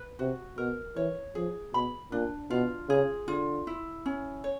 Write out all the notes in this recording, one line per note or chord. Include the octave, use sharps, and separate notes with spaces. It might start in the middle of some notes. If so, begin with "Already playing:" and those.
Already playing: B4
C3 F#4
B2 A#4
E3 C#5
F3 G#4
B2 B5
A#2 D4
B2 F4
C#3 G#4
D3 F4
E4
C#4
C#5